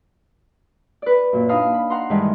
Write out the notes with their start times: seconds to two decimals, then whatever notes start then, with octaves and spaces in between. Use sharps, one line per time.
1.02 B4 D5
1.32 F#2 A#2
1.49 D4 D#4 F5 B5 D#6
1.74 B5
1.90 F#5 A#5 C6
2.10 G2 D#3 E3 G3 G#3